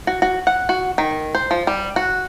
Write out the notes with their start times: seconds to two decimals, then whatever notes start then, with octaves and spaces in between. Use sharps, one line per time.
0.07 F#4
0.22 F#4
0.47 F#5
0.69 F#4
0.98 D#3
1.35 C5
1.51 F3
1.67 G3
1.96 F#4